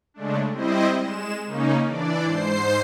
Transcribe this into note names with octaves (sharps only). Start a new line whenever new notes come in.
C#3 G#3 A3 D4
G3 C4 E4 C5 D#5
G#3 E7
C#3 A#3 C#4 D#4
E3 D4 D5
G#2 C5 C7